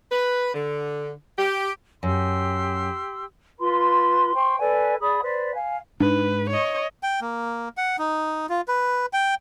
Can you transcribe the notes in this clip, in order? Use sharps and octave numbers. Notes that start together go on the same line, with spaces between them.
B4
D3
G4
F#2 G4 C6 E6
F4 B4 B5 C6
C5 G5 C6 C#6
A4 B4 D5 G#5
G#4 D5 B5 D#6
B4 C5 D5
F5 G#5
G#2 D4 B4
C#5 D#5
G5
A#3
F#5
D#4
F4
B4
G5